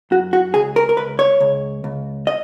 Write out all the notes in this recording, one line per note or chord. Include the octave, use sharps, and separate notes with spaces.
F#2 F#4
F#4
C#2 G#4
A#4
A#4
C#2 B4
C#5
C#2
C#2
D#5